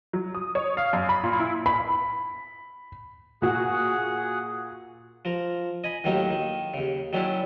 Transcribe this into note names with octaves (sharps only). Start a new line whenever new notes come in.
F#3
D#6
C#5
F5
F#2
B5
A#2
E4
B5
A#2 F#4 G#4 F#5
F3 A#4
D#5 G#5 B5
D#2 A2 D#3 F#3 A#3 D#4
D#3
D#2 C#3
D#3 F#3 C#4 D4 E4